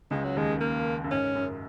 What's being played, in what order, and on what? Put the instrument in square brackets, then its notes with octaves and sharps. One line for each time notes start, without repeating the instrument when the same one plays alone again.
[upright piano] C#2 C#3 [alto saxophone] G#3
[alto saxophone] F#3
[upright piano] D#2 D#3 [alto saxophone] G#3
[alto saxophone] A#3
[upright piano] F#2
[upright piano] G#2 [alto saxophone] C#4
[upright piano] F#2